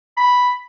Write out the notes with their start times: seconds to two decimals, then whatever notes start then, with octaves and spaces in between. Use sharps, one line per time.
0.17 B5